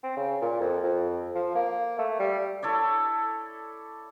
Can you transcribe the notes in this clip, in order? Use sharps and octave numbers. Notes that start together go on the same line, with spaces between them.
C4
C#3
A#2
F2
F2
F3
A#3
A3
G3
E4 A4 C#5 D5